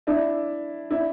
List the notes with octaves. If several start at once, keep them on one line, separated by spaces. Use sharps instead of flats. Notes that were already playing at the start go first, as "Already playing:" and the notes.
D4 E4
D4 E4